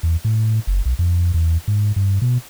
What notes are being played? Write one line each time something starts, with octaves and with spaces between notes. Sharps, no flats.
E2
A2
F#1
B1
F2
E2
G#2
G2
B2